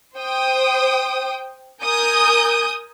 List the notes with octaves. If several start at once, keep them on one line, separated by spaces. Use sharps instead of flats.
C5 G5 D#6
A#4 G#5 D#6 G6